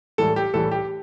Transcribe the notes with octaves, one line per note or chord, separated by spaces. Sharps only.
A2 E3 G3 A4
G4
A2 E3 G3 A4
G4